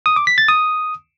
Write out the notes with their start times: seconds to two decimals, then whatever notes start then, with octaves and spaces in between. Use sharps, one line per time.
0.06 D#6
0.16 D6
0.27 B6
0.38 A6
0.48 D#6